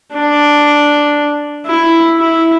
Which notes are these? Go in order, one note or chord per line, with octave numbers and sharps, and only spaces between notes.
D4
E4
E4